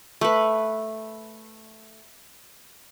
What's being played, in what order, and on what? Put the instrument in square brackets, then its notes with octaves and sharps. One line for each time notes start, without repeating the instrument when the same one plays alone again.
[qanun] A3 B4